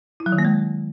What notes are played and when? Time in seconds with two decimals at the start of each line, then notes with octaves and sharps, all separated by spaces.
0.20 E4
0.26 F#3
0.32 D#3
0.38 A#3
0.45 G#3